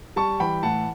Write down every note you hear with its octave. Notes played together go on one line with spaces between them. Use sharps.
G3 A5 C#6
E3 G5 B5
A2 F#5 A5